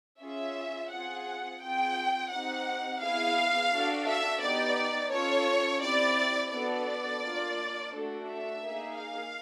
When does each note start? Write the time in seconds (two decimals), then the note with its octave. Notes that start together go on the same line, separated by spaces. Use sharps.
0.20 C#4 F4 G#4 E5
0.91 C4 F4 G#4 F#5
1.61 C4 F4 G#4 G5
2.30 C4 D#4 G4 F#5
3.01 B3 E4 G#4 F5
3.71 D4 F#4 A4
4.06 E5
4.41 B3 D#4 G4 D5
5.11 C#4 F4 A4 C#5
5.81 C4 E4 G4 D5
6.51 B3 D4 F#4 A4 D5
7.21 A#3 D4 F4
7.91 A3 D4 F#4 A4
8.27 E5
8.61 A#3 D#4 G#4
8.96 F5